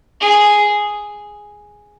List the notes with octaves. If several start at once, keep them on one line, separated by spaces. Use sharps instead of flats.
G#4